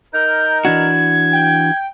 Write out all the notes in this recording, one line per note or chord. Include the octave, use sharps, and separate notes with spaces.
D#4 A#4 G6
E3 D4 F#4 G#6
G5